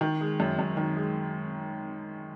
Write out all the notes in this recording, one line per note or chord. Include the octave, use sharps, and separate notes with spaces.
D#3
G#3
F#2
F#2
D#3
G#3